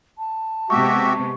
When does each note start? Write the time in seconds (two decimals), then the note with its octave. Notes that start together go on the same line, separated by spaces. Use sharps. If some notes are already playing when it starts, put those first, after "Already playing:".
0.18 A5
0.70 C3 G#3 B3 F#4 G4 E5 C#6